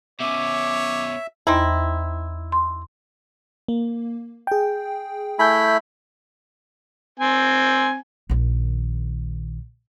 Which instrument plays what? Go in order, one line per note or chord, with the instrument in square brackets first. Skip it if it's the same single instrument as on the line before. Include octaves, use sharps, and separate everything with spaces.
[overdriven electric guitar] B2 C#4 [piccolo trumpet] C#5 [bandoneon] E5 [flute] D6
[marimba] E2 [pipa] C4 D#4 E4
[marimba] C6
[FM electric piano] A#3
G#4 G5
[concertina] A3 E4 B5 [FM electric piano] G#5 G6
[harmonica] C4 G#5
[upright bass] A#1 D#3